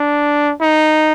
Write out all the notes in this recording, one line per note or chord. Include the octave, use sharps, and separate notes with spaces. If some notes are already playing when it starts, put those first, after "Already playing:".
Already playing: D4
D#4